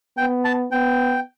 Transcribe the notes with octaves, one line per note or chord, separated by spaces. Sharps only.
B3 G5
A5
B3 G5